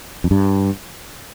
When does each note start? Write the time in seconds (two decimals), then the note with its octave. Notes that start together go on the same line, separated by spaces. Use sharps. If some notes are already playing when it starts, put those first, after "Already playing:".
0.24 F2
0.31 G2